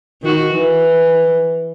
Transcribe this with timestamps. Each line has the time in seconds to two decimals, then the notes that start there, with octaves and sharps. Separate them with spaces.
0.22 D#3 F#4
0.53 E3